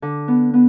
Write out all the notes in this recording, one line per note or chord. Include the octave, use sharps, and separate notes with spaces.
D3
B3
B3